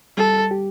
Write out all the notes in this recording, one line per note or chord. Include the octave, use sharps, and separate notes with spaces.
G3 A4
G4